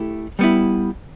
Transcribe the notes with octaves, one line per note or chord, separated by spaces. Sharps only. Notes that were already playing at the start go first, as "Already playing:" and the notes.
Already playing: A3 E4 G4
G3 B3 E4